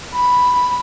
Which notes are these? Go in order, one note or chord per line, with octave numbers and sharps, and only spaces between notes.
B5